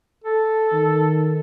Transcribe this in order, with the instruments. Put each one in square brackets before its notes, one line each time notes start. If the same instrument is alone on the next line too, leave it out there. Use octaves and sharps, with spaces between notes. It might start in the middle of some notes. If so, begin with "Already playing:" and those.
[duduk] A4
[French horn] D#3